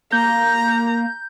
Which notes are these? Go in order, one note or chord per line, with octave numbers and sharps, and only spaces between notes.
A#3 A#5 G6